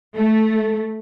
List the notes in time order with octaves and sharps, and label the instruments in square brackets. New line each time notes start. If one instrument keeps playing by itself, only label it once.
[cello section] A3